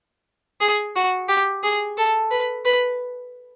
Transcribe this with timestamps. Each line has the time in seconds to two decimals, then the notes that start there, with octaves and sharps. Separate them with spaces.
0.61 G#4
0.96 F#4
1.29 G4
1.63 G#4
1.97 A4
2.31 B4
2.65 B4